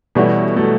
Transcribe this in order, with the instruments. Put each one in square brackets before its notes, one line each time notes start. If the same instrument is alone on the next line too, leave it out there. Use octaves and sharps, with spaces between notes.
[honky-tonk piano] B2 A3 C#4 F#4 [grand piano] E3 G3
[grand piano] F#3 A3